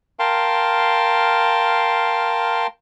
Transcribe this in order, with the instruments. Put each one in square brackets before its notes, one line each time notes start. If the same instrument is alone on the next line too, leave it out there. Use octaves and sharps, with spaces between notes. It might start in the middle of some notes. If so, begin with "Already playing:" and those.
[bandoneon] A#4 F5 G5 A5 C6